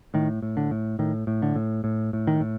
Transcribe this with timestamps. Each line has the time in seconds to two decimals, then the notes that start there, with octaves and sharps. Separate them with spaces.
0.14 A2 D#3
0.42 A2
0.57 D3
0.71 A2
0.99 A2 D#3
1.27 A2
1.42 D3
1.56 A2
1.84 A2
2.13 A2
2.27 D#3
2.40 A2